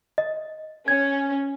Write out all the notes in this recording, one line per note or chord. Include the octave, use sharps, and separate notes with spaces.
D#5
C#4 G#6